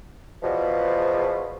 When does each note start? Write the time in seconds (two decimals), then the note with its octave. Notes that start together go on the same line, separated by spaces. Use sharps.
0.43 E2 B2 F3